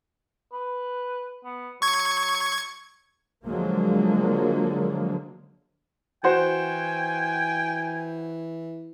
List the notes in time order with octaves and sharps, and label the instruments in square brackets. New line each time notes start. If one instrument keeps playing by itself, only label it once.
[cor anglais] B4
B3
[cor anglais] F#3 [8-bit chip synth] C#6 G#6
[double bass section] D3 F3 F#3 G#3 A#3
[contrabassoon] E3 [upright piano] F#4 C5 [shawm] G5 [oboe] G#5